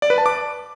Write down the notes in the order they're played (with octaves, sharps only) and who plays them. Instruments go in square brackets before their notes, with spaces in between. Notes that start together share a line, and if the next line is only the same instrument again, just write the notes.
[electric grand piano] D5
B4
A5
D6